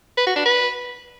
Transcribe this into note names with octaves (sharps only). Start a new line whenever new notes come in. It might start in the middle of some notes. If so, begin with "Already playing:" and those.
B4
F#4
D4
B4